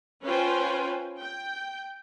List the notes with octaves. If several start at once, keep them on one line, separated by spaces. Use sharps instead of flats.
C#4 F4 B4 C5 G5 G#5
G5